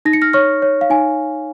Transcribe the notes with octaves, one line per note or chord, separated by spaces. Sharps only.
D#4 A#6
C#7
F6 A#6
C#5 C#6 F6
C#5
F5
D#4 G#5